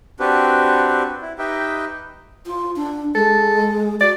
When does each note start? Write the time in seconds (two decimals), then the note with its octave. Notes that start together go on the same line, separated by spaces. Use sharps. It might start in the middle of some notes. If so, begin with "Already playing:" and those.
0.20 C4 D4 F#4 G4 B4
1.22 E4
1.38 D#4 G4 B4 D#5 E5 G5
2.46 F4
2.76 D4
3.15 G#3 A4
4.00 F#4 D5